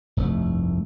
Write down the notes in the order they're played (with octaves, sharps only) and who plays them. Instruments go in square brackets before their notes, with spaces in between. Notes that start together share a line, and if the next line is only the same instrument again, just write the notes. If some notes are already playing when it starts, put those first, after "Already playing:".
[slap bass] F1 C2 G2 A3